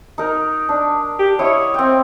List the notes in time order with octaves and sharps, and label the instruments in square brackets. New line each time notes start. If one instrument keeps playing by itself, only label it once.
[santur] D#4 A#4
D4
[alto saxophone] G4
[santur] E4 D#5 F#5 [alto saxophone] C#5
[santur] C4 G5